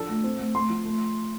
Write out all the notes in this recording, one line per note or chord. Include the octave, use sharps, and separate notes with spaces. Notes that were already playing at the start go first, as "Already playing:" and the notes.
Already playing: F3 D4 A4
A3
C4
A3
A3 C6
F3
A3